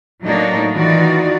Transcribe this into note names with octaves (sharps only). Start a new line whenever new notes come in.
A2 F#3 A#3 D4 D#4 F#4
D#3 E3 D#4 F4 F#4 D5